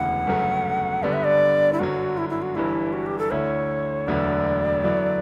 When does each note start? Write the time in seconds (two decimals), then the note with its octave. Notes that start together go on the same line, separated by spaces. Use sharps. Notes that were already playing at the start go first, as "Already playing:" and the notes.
Already playing: E1 D2 C#3 E3 B3 F#5
0.27 G1 F#2 C#3 F#3 A3
1.03 G1 G2 D3 G3 B3 D5
1.13 E5
1.24 D5
1.73 E4
1.79 G1 F#2 D3 F#3 F#4
2.18 E4
2.30 E4
2.42 F#4
2.55 G1 G2 E3 G3 E4
2.93 F#4
3.06 G4
3.19 A4
3.31 D2 D3 A3 E4 C#5
4.07 E1 D2 D3 F#3 B3 D5
4.84 F#2 D3 F#3 B3 E4